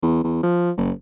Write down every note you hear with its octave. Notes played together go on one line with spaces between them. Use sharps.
E2
E2
F3
F#1